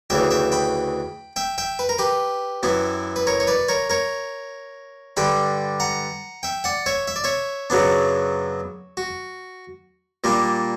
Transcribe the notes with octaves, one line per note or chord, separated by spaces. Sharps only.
D2 C#3 E3 E5 G5
E5 G5
G5 B5
E5 G5
E5 G5
B4
A#4
G4 B4
F#2 E3 B3 E4
B4
A#4 C#5
C#5
B4 D5
A#4 C#5
A#4 C#5
G2 D3 G3 G5 B5
F#5 A#5
E5 G5
D5 F#5
C#5 E5
E5
D5
C#5 E5
F#2 C#3 F#3 B3 D4
F#4
A#2 G3 A#3 D4